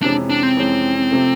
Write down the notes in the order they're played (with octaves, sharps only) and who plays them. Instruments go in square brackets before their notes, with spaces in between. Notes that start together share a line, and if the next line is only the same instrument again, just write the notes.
[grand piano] F2 C3 E3 G#3 C#4 [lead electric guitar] D4
[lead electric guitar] D4
C4
[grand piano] F2 C3 E3 G#3 C#4
C3 F3 A3